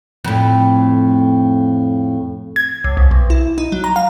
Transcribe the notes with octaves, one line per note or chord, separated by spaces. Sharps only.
F2 A2
G#6
C#2
C2
B1
E4
D#4
F#3
A#5
F5